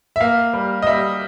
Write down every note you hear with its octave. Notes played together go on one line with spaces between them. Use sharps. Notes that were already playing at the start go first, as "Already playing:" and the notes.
E5
A#3 F5
G3
D#5
G3 E5